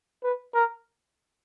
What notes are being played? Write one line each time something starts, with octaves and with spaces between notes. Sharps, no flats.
B4
A#4